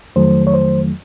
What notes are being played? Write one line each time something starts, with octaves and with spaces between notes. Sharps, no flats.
F2 D#3 F#3 A3 C5
C#5
C5